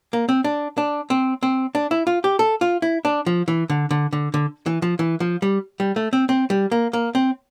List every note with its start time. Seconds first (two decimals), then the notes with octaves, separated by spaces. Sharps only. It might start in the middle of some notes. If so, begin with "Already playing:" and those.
0.13 A#3
0.29 C4
0.44 D4
0.78 D4
1.10 C4
1.43 C4
1.75 D4
1.91 E4
2.07 F4
2.24 G4
2.39 A4
2.61 F4
2.82 E4
3.05 D4
3.26 F3
3.48 E3
3.70 D3
3.91 D3
4.13 D3
4.34 D3
4.66 E3
4.82 F3
4.99 E3
5.20 F3
5.42 G3
5.80 G3
5.96 A3
6.13 C4
6.29 C4
6.50 G3
6.72 A#3
6.93 A#3
7.15 C4